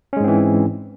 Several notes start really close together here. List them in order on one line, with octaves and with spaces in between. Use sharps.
C#4 G#3 G#2 C4 E3